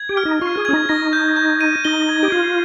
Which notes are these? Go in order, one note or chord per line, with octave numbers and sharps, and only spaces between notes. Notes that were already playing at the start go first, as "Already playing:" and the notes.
Already playing: G#6
G4
F6
D#4
F4 C#6
G#4
C#4 G#6
D#4
D#4 A#6
G6
G6
D#7
D#4 G7
G#6
G4
F4 G#6